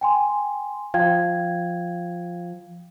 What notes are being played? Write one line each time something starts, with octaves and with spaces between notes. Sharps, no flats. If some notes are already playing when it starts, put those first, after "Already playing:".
G5 G#5 C6
F3 F5 G5 G#6